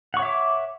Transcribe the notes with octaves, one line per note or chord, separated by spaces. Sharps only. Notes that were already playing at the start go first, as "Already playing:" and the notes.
C#5 E5 F#5 C#6 D6